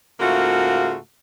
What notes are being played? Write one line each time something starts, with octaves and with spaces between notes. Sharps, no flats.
G#2 C#3 A3 A#3 F4 F#4